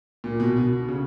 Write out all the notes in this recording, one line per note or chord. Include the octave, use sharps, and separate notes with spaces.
A#2
B2
B2
B2
C#3